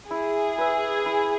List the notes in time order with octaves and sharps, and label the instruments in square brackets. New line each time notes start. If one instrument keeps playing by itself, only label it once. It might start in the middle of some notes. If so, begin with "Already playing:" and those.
[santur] E4 [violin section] G#4
[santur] B4 E5
E4